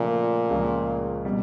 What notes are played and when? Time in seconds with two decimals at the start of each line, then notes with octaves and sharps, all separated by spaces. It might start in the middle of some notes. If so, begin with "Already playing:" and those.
Already playing: A#2 C#3 F3 A3
0.50 C#2 C#3 F3 A#3
1.25 B2 G3 A#3